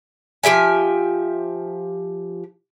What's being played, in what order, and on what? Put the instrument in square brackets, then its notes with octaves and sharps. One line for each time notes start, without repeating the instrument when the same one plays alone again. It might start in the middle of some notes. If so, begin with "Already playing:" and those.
[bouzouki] F3 G4 E5 G#5